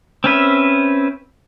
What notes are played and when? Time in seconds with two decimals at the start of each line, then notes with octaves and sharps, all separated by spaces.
0.24 C4 C#4 B4 E5